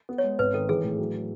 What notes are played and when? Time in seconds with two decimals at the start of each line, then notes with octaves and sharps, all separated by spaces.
0.09 B3
0.18 C#5
0.24 G#3
0.39 G#1 B4
0.54 D#3 A4
0.69 E3 G#4
0.84 A2
0.99 F#3